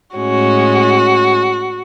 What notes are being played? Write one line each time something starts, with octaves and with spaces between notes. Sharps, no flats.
A2 G#3 C#4 F#4